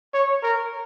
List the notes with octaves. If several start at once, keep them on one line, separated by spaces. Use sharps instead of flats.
C#5
A#4